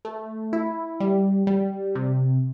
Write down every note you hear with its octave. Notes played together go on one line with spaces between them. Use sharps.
A3
E4
G3
G3
C3